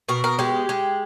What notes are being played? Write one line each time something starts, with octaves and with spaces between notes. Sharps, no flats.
B2 A#4
A#4
G#3 G4
G#3